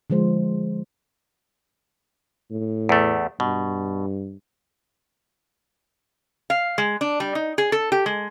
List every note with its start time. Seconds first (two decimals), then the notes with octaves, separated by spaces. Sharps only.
0.10 D3 F3 G#3 C5
2.51 A2
2.89 E2 A3
3.40 G2 B2
6.50 F5
6.78 G#3
7.01 D4
7.20 G3
7.35 D#4
7.58 G#4
7.72 A4
7.92 G4
8.06 G#3